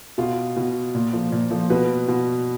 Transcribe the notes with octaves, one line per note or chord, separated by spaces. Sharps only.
B2 F4
B2
A#2
F3
A#2
F3
B2 B4
B2